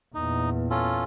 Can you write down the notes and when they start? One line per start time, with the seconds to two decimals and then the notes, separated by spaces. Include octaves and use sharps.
0.14 E2 A#2 D#4
0.70 C#4 F4 A4